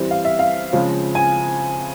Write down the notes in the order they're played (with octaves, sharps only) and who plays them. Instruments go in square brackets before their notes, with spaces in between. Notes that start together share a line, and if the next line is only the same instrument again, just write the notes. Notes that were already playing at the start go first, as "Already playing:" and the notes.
Already playing: [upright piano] E3 G3 C4
F5
E5
F5
C#3 F3 G#3 C4
G#5